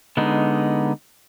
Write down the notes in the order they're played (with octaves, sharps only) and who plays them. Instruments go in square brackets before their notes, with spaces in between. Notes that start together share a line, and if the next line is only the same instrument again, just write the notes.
[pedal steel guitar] D3 G#3 B3 D#4